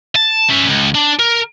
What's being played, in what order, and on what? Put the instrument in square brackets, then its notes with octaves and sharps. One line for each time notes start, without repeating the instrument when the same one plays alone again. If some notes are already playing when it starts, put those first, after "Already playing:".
[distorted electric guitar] A5
C#4 E5
C#2
D4
A#4